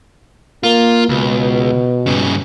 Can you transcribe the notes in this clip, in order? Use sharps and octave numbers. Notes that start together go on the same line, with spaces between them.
A#3 F4
C#2 B2
G2 C#3